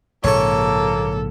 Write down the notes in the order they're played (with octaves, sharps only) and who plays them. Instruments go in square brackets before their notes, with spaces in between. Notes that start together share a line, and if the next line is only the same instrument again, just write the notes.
[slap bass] A#1 G#2 C#3 [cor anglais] A#3 [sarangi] A4 [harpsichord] C#5 C#6